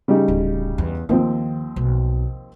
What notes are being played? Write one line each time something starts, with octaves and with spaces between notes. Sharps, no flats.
C#3 G3 D#4
D1
E2
D#2 D#3 F3 C4
B1